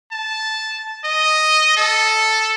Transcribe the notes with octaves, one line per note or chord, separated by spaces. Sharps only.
A5
D#5
A4